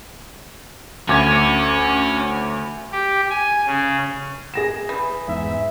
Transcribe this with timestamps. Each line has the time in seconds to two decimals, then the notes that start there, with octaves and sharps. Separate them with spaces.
1.09 D2 C#4 D6 G#6
2.92 G4
3.30 G#5
3.67 C#3
4.54 G#4 A#6 E7
4.89 E3
5.28 E2 G#2 E5